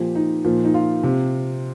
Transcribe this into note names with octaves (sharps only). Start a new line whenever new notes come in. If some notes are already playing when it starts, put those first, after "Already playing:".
Already playing: A#2 F3 G4
D#4
A#2 F3
D#4
F4
C3